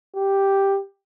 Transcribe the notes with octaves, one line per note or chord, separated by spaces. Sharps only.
G4